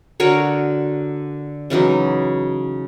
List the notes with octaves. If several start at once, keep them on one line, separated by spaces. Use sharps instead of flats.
D3 F#4 A#4 C#5
C#3 E3 F#3 D#4